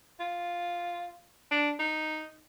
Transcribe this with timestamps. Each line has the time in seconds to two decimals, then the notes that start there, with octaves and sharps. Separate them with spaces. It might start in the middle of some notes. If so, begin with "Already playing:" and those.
0.20 F4
1.51 D4
1.80 D#4